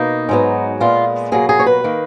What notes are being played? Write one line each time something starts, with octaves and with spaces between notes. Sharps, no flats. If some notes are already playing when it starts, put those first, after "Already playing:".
Already playing: B2 A#3 D#4
G#2 F#3 B3
A#2 G#3 B3 F4
B2 F#3 A#3 G#4
G#4
C#5
B4
D#3 A#3